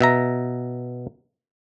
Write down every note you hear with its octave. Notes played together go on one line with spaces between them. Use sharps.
B2 E5 A#5